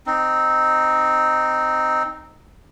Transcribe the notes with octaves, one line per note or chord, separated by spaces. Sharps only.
C4 D#4